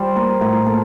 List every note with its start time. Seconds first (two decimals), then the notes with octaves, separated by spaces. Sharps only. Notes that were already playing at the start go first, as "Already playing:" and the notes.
Already playing: G3 C5
0.16 A#3 A#4
0.41 A2 A#4
0.66 A#3 A4